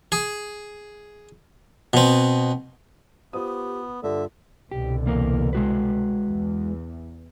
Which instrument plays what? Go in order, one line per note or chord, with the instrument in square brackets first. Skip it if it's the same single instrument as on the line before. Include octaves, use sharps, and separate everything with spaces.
[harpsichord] G#4
B2 C4
[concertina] B3 [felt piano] F4 C5 D#6 [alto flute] G4
[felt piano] G2 [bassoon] D3 [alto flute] F4 [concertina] E5
[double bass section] C2 B2 D3 [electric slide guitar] G4
[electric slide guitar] E2 A#3 A#4
G#3 F#4 B4
[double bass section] E2